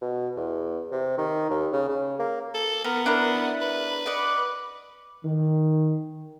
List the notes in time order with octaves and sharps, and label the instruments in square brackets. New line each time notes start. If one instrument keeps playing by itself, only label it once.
[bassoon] B2
E2
C3
D#3
D#2
C#3
C#3
A#3
[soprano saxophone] A4
[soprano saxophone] B3 [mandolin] A#4
[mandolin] D4 E4 A#4
[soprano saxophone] B4
[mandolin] D5 D#5 F#5
[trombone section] D#3